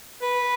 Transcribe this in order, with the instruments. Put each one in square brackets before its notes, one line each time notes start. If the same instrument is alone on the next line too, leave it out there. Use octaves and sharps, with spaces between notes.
[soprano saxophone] B4